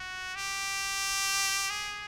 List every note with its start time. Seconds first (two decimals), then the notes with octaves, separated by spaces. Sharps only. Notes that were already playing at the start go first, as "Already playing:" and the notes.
Already playing: F#4
0.35 G4
1.70 G#4